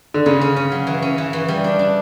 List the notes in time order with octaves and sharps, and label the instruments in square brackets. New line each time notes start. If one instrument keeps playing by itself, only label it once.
[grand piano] D3
[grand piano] C#3 [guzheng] C#4
[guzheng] C#4
C#4
F#3
E3
C#4
E3
E3
G3
D4
D4